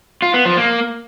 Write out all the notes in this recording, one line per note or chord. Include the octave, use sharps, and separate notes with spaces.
F4
B3
F3
A#3